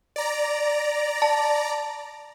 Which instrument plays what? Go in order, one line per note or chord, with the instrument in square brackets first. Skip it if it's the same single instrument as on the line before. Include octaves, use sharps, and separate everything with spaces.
[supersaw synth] D5 A#5
[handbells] A5